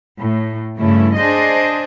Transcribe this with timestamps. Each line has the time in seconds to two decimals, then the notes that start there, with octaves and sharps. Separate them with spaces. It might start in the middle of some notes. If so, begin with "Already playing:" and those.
0.20 A2
0.76 G2 C#3 A3 E4
1.16 D4 G#4 C5 D#5